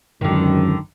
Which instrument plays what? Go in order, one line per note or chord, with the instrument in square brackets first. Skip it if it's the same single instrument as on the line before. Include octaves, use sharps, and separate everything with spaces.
[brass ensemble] G#1 C#2 F#2 [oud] D3 D#3